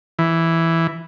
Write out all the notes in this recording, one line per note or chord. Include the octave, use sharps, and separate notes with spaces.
E3